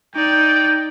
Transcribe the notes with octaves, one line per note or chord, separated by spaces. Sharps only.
D#4 D5 G5